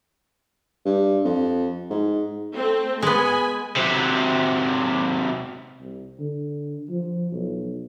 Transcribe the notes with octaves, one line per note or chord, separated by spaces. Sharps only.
G2
F2
G#2
A3 C4
G#3 B3 G#5 B5
C3 F#3
C2
D3
F3
B1